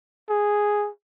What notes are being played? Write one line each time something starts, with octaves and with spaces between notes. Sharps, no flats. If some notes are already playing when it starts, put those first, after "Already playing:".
G#4